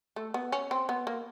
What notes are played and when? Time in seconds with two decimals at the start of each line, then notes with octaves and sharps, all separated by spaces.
0.16 A3
0.34 B3
0.52 C#4
0.71 C4
0.89 B3
1.07 A#3